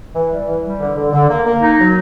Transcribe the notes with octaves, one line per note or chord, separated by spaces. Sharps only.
E3
G3
E3
G3
D3
D3
D3
A#3
A#3
D#4
F#3